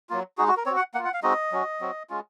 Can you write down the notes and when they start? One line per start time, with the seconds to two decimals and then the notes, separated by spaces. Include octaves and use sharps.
0.10 F#3 A#3 F4
0.38 G#3 D#4 F#4 G#4
0.48 F#4
0.57 A#4
0.66 C4 F#4 C#5
0.77 F#5
0.94 A#3 F4 F#5
1.05 F#5
1.13 F5
1.23 G#3 C4 D#4 F#4 D#5
1.52 F#3 C#4 F#4
1.80 F#3 C4 F#4
2.10 G#3 C#4 F4